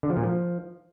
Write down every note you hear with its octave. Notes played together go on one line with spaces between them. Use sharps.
D3
F3
A#2
F3